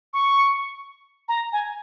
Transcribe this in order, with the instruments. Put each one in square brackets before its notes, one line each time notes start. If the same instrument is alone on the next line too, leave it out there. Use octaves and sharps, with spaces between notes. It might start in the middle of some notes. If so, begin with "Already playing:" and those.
[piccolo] C#6
A#5
G#5